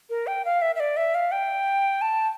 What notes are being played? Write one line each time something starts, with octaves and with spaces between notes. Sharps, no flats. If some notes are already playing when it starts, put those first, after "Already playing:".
A#4
G5
F5
E5
E5
D5
E5
F5
G5
A5